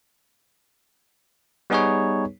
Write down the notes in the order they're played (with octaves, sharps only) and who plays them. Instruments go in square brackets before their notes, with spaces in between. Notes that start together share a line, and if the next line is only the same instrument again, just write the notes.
[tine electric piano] G3 B3 D#4 G#4 B4 C#5